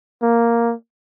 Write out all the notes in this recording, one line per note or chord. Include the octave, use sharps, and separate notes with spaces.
A#3